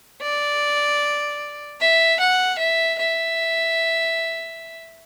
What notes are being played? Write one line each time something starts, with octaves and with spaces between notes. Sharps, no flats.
D5
E5
F#5
E5
E5